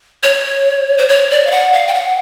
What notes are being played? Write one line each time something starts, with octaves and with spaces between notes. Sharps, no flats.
C#5
C5
C#5
D5
F5
F#5
F5
G5
F#5